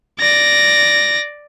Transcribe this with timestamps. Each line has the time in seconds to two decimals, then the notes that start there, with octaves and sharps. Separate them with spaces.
0.20 D5 A#6